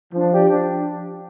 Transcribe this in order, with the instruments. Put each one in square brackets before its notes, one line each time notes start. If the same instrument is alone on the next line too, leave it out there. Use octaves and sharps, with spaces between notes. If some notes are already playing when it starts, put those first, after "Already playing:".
[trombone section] F3 [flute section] D4
[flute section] G4 D5 G5
D4